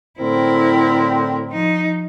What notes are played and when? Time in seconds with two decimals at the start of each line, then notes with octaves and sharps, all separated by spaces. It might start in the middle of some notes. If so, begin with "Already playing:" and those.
0.20 A2 D3 C4 E4 A#4
1.50 F3 D#4